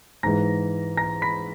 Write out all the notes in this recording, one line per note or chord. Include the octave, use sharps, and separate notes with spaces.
G#2 E3 G#3 A#5 A#6
A#5 A#6
B5 B6